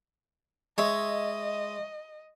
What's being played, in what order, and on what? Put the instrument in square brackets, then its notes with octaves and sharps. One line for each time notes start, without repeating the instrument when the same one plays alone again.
[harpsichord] G#3 [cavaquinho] C#5 E5 [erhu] D#5